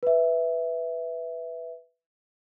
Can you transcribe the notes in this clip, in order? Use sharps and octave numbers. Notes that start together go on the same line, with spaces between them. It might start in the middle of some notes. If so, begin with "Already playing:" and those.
B4 E5